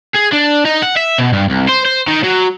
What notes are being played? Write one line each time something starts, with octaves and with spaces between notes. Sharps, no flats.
G#4
D4
D#4
F#5
E5
B2
G2
C2
C5
C5
D#3
F#3